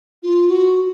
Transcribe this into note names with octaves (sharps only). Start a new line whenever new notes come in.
F4
F#4